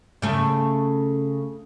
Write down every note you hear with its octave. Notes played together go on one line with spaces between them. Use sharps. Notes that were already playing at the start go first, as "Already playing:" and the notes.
C#3 A3